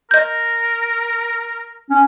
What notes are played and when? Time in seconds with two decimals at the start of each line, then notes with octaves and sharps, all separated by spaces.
0.11 A#4 D#5 G6
1.90 C#4